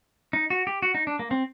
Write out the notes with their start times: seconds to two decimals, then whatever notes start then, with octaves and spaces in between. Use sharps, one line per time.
0.33 D#4
0.50 F#4
0.67 G4
0.82 F#4
0.95 D#4
1.07 D4
1.19 A#3
1.31 C4